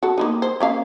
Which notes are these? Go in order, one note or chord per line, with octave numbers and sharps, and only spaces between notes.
F#4 A4
A#3 B3 D#4
C5
A#3 C#4 F5